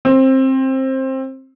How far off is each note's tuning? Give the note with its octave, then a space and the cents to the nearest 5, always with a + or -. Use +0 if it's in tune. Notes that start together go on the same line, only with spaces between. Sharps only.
C4 +20